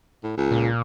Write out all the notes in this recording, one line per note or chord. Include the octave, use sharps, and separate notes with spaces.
A2
C#2
A#2